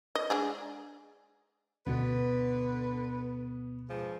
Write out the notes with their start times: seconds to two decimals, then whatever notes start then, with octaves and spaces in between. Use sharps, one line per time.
0.15 D#5
0.30 G#3 D4 G#4
1.87 D2 B2 D3 B3 B4
3.89 G2 F3 G#3